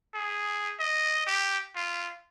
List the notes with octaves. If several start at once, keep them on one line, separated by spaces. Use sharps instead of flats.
G#4
D#5
G4
F4